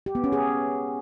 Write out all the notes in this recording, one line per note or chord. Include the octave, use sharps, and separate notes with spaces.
G4
B3
C#4
G#4